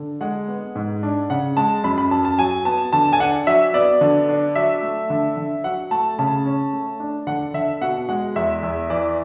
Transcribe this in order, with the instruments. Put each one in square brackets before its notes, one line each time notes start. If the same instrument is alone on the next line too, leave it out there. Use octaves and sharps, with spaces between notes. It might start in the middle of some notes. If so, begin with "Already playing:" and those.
Already playing: [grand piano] D3
G#3 F#5
B3
G#2
D4
C#3 F#5
G#3 A5
F#2 B5
B5
F#2 A5
A5
F#3 G#5
B3 A5
D3 A5
G#5
D4 F#5
F#3 E5
B3 D5
D3
D4
F#3 E5
A3
D3
D3
F#3 F#5
A3 A5
C#3 A5
C#4
A3
D4
D3 F#5
D3 E5
B2 F#5
G#3 F#5
E2 E5
E2
E3 D5